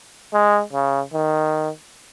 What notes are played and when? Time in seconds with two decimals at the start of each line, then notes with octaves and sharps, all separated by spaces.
0.33 G#3
0.73 C#3
1.13 D#3